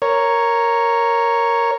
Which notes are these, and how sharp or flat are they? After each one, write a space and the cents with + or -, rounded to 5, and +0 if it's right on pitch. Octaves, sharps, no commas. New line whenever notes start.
A#4 +0 C#5 +0